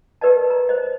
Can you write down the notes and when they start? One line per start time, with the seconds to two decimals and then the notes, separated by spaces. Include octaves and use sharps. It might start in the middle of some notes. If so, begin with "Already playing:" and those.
0.21 G4 A#4 B4 D5 D#5 A5
0.50 A#5
0.69 C5 D#5